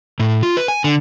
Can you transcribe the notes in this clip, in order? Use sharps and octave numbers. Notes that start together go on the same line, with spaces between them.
A2
F4
B4
G#5
D3